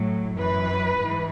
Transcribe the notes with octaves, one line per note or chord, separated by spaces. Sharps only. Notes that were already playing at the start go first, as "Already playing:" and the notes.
Already playing: A2 F#3
F#2 E3 B4
G#2 E3